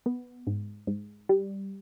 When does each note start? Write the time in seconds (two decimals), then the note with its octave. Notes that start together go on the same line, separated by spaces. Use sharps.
0.06 B3
0.47 G#2
0.87 G#2
1.29 G3